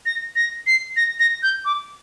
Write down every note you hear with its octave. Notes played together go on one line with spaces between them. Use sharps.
A#6
A#6
C7
A#6
A#6
G6
D6